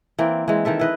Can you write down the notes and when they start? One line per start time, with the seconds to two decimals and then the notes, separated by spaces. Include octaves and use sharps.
0.18 E3 A#3 C4
0.48 E3 G#3
0.65 D#3 E3 A4 E5
0.79 E4 B4 D#5